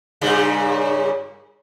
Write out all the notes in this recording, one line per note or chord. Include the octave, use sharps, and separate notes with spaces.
G2 A#2 C#3